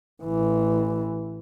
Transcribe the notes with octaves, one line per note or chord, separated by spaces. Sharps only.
A1 E3